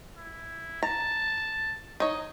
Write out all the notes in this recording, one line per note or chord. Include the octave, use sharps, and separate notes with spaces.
E4
A5 A#5
D#4 C#5 D#5